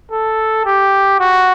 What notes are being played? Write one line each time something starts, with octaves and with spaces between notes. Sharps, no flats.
A4
G4
F#4